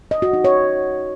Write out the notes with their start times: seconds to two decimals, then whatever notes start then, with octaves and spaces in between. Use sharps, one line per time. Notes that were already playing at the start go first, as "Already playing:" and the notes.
0.11 D#5
0.22 F#4
0.33 D#4
0.44 C#5